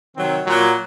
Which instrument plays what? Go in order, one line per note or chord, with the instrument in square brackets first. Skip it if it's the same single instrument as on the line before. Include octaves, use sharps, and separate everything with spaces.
[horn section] C3 D#3 F#3 C4
A#2 F#3